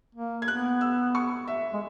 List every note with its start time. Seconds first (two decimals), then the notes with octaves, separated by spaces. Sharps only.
0.15 A#3
0.42 G#6
0.48 B3 F#6
0.81 E6
1.15 C#6
1.48 E5
1.73 G#3